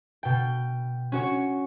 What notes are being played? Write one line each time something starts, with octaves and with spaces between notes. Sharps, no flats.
B2 G5
C#4 F#4 C#5